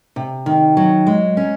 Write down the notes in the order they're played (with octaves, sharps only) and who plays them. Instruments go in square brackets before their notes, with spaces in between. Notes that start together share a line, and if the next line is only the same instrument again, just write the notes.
[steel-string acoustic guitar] C3
D#3
F#3
G#3
C#4